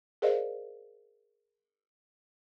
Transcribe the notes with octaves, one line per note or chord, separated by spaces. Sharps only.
G#4 A#4 C5 D5 D#5 F5